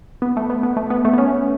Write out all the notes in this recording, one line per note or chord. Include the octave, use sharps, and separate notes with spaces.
B3
A3
B3
B3
A3
B3
A3
B3
C#4